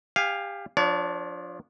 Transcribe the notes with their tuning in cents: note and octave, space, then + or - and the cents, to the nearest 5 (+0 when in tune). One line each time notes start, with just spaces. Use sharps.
G4 +25 F5 +0 G#5 +0
F3 +15 D4 +0 C#5 +45